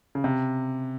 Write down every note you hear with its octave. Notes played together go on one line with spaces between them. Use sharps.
C#3
C3